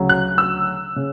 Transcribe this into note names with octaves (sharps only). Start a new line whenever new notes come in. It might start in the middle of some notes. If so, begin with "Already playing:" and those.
Already playing: D2 C#3 F#3
F#6
E6
C#3